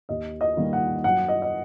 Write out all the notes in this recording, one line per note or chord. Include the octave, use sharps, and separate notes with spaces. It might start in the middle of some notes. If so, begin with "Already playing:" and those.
D#2 D#5
D#5
D#3 G3 A#3
F#5
F#2 F#5
D#5
D#5